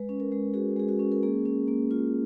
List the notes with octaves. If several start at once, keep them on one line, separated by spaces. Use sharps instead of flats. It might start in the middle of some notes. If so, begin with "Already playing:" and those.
Already playing: G#3 B4
C#4
A#4
G#3
F#4 G#4
G#3 G#4
F#4
C#4
A#4
A#3 G#4
C#4
A#3
F4